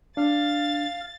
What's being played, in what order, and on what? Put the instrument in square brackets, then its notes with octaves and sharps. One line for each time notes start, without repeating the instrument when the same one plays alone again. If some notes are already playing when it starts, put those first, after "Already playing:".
[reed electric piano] D4 [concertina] F5 [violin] A6